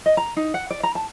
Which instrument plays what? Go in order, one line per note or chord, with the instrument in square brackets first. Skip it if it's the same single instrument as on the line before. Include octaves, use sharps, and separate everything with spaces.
[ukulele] D#5
A#5
D#4
F#5
D5
A#5
A5